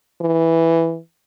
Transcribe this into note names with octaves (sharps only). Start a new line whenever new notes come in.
E3